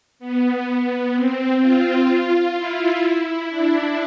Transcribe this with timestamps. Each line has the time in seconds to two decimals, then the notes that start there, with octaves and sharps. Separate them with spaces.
0.19 B3
1.14 C4
1.61 F4
2.56 E4
3.50 D4